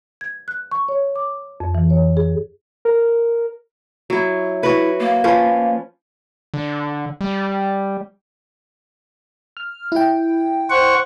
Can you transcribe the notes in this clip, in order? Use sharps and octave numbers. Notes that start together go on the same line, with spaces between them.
G#6
F#6
C#6
C#5
D6
F2
E3
C#5
G#4
A#4
F#3 E4
E4 F#4 B4
A#3
F3 C#4 B4
D3
G3
F6
E4 G5
C5 F#5 C#6